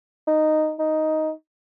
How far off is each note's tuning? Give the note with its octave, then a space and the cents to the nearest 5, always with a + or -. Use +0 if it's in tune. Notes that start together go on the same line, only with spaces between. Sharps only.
D#4 -10
D#4 +5